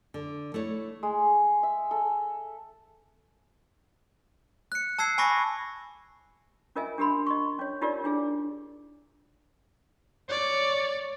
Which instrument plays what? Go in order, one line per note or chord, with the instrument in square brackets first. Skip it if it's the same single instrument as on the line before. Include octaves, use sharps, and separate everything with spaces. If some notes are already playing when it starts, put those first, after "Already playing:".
[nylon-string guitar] D3
A3 E4 C#5
[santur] G#3
E5
A4
[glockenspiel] F#6 C#7
A5 E6 G#6 C7
G#5 B5 C#6 D6 A#6
[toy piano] C#4 F4 A#4 D#5 E5 G#5
D4 G4 A#4 B5 C6
D#5 C6 C#6
C#4 C#5
D#4 F4 G4 A#4 C#5 D5
D4 E4 G#4
[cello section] C#5 [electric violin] D5